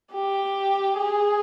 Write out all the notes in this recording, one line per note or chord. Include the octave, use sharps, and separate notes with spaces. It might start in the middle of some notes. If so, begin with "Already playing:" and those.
G4
G#4